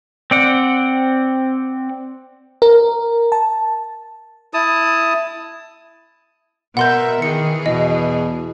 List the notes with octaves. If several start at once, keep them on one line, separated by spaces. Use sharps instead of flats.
C4 D5 F#5
A#4
A5
E4 A5 D#6
B2 B3 A#4 E5 F#5 C6 G6
D#3 E3 G#4 C#7
E2 B2 D#5